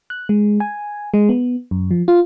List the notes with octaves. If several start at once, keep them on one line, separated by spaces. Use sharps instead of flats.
F#6
G#3
G#5
G#3
B3
F#2
F3
F4